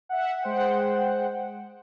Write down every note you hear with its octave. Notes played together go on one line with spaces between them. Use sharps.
E5 F#5
G#3 C5 F#5 G5